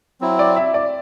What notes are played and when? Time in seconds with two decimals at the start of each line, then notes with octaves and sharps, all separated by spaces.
0.21 F#3 C4 E4
0.39 D5
0.56 E5
0.74 D5